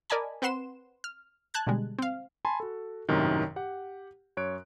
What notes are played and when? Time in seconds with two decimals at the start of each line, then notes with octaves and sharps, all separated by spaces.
0.10 A#4 D5 D#5 G#5 A5 B5
0.42 C4 B4 F#5 C6 E7
1.04 F6
1.54 A5 F#6 G#6
1.67 B2 D3 G3 G#3
1.99 C4 F5
2.45 G#5 A5 B5 C6
2.60 F#4 A4
3.09 G#1 F#2 A2 C3 D#3
3.56 G4 F#5
4.37 F#2 C#5 F#6 D7